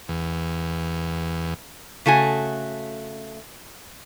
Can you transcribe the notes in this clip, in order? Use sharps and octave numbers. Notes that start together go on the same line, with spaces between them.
E2
C#3 A3 F#4 G#5